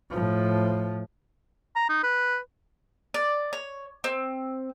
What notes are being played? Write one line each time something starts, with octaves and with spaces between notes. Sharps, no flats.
A2 F3
A#5
D#4
B4
D5
C#5
C4